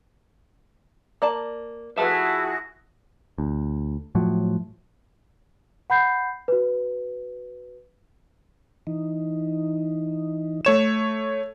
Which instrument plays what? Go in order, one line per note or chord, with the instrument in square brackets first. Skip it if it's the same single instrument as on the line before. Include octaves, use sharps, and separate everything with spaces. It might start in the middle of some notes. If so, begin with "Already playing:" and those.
[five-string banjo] A#3 D5 A5
[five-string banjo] F3 B4 [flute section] E4 F#4 G#4 [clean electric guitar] E5 A5
[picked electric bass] D2
A2 F3 F#3
[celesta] F#5 B5 G6 C7
F#4 B4
[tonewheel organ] E3 D#4
[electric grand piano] A3 C#5 E7